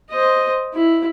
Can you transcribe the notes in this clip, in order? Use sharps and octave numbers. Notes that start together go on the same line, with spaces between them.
C5 D#5
E4